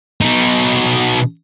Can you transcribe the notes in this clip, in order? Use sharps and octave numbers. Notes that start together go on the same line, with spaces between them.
B2 D#4